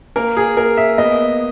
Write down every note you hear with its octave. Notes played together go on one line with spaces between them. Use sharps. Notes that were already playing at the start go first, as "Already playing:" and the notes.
A#3 A#4
G#4
A#3 A#4
E5
B3 D#5